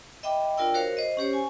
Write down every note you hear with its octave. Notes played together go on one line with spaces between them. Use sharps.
D#5 E5 G5 B5 D6
D4 F4 A#4 D5 G5 E6
F#4 A#4 C5 C#5 F5
C5 D#5
C#4 G4 C5 C#5
G#5 C#6